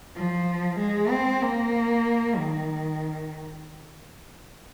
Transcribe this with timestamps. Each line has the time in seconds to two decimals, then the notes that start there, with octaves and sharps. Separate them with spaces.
0.15 F3
0.79 G#3
1.10 C4
1.42 A#3
2.36 D#3